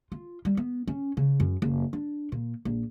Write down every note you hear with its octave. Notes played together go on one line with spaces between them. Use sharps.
F4
G3
B3
C#4
C#3
F#2
F#1
D4
A#2
A#1